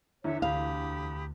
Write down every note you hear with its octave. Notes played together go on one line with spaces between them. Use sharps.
E2 D3 C#5 E5
D2 G4 F5 B5 D#6